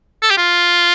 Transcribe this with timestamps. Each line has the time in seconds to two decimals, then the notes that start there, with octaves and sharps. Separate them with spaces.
0.23 A4
0.30 G4
0.38 F4